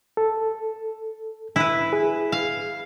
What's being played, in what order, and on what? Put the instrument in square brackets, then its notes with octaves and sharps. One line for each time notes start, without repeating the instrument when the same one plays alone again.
[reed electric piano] A4
[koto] E4 B4
[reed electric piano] G#4
[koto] F5